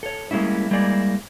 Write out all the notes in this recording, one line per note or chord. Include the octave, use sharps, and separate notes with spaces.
A4 C#5
G3 G#3 A#3 C#4 E4
G3 G#3 A#3 E4 D5